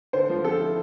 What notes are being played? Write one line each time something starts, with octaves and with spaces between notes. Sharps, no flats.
D3 C5
F3
C4 A4
E4